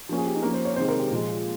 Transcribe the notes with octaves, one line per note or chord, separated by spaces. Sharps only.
F3 A#3 C#4
G#4
G4
D#4
F3 A#3 C#4 A#4
C5
C#5
C3 D#3 G#3 C5
A#4
G4
A#2 F3 G#3